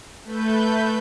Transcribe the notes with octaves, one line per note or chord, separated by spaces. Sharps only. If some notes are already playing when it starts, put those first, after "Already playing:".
A3 B4 G6